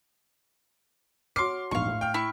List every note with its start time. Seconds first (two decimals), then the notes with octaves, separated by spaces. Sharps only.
1.36 F#4 C#5 C6 D6 F6 C7
1.71 A#1 E2 G#2 F5 C#6
1.87 A2
2.01 G5 F6
2.14 E4 C#6